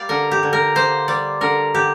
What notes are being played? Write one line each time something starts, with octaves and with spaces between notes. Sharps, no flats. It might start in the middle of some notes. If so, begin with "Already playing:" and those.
Already playing: G3 A#3 D5 F5
D3 A#4
G4
D3
A#4
A#3 C5
G3 D5
D3 A#4
D3 G4